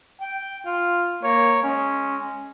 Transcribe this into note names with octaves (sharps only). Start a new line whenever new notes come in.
G5
F4
A#3 C#5
G#3 C#4